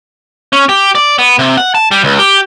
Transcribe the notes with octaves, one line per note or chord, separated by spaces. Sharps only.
C#4
G4
D5
B3
C3
F#5
A5
G3
C#2
G4